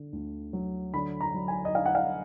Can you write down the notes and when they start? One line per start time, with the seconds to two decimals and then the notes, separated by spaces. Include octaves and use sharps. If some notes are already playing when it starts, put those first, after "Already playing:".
Already playing: D3
0.13 D2
0.53 F#3
0.94 D3 B5
1.21 A#5
1.34 F#3
1.48 G#5
1.65 D#5
1.75 D3 F5
1.86 F#5
1.95 F5